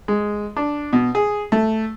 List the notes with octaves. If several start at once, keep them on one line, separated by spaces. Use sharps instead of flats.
G#3
D4
B2
G#4
A3